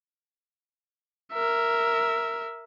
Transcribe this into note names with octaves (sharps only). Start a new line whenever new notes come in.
A#4 E5